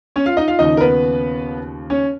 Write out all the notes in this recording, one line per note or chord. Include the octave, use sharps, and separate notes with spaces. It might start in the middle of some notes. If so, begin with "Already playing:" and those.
C#4 C#5
F4 F5
D#4 D#5
F4 F5
D#2 C#3 F3 D#4 D#5
A#4
B3 B4
C#4 C#5